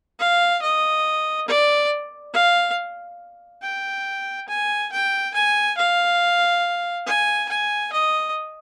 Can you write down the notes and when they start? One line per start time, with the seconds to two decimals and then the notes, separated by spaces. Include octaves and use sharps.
0.19 F5
0.62 D#5
1.48 D5
2.34 F5
3.62 G5
4.48 G#5
4.91 G5
5.34 G#5
5.77 F5
7.06 G#5
7.49 G#5
7.92 D#5